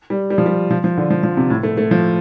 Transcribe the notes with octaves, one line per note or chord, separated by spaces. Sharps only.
G3
G3
F3
G3
F3
F3
D3
F3
F3
C3
A2
A3
A3
F3